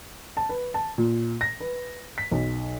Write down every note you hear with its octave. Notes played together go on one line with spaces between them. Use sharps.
A5
B4
A5
A#2
A#6
B4
B6
B1